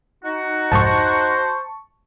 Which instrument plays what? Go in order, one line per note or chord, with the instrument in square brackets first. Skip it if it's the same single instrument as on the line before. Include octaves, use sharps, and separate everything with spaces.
[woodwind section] D#4 F#4
[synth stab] C2 F2 G#2 [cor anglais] C5 [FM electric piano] A5 C#6